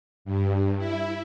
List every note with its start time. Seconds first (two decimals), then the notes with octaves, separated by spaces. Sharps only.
0.25 G2
0.78 E4